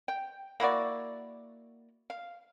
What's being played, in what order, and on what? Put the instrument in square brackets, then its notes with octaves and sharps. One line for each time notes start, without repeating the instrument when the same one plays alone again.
[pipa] G5
A#3 E4 F#4 D5
F5